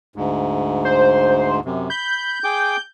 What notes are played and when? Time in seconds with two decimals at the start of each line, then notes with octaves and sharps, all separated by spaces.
0.16 D2 G#2
0.85 C5
1.65 F#2 C3
1.90 B5 G6
2.44 G#4 G5 D6